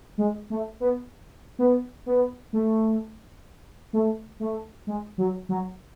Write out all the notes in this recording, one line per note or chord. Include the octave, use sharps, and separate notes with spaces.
G#3
A3
B3
B3
B3
A3
A3
A3
G#3
F#3
F#3